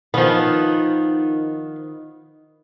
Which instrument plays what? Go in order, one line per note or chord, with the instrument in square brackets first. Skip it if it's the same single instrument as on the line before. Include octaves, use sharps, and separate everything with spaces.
[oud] D#3 [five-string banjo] F3 B3